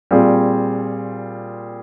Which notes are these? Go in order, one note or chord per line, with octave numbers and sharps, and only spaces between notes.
A#2 G3 C4 F4 G#4